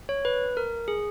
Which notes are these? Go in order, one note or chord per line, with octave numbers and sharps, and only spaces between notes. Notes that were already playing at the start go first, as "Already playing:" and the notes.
C#5
B4
A#4
G#4